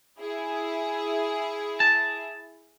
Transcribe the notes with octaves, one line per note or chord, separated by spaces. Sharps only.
E4 G#4
A5